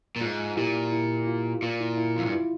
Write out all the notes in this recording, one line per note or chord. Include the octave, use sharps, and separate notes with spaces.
A#2
G#2 F4
A#2 E4 G4
E4
F4
A#2 F4
E4
E4
F2 F4
G2
E4